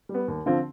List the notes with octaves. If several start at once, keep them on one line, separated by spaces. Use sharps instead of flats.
G3
B3
D#2
D3 F3 C4 F4